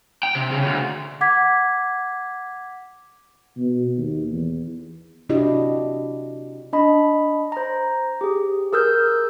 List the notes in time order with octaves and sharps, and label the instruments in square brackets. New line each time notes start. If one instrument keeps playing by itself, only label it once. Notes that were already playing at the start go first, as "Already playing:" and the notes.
[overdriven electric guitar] G5
C3
C#3
D2
[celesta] F#5 D6 G#6 B6
[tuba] B2
D#2
E2
[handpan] C3 D4 E4 F#4 G4 D#5
[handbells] D4 D#5 B5
C5 A#5
G4 G#4
G#4 A#4 E6 F6 G6